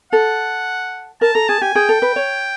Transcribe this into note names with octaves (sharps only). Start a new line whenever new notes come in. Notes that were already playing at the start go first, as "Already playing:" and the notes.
A4 F#5
A#4 A5
A4 A#5
G#4 A5
G4 G#5
G#4 G5
A4
B4
C#5